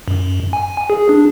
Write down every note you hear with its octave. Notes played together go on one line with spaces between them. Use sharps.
F#2
G#5
G#4
D4